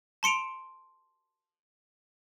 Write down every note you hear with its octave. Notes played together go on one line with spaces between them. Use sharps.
A5 C6 C#7 D7 F7